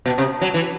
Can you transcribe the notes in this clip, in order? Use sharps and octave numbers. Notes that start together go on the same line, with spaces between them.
B2
C3
F#3
E3